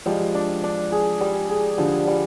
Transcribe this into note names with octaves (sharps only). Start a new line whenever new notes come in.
F3 G3 G#3
D4
D4
G#4
G3
G#4
D3 F3 G3
G3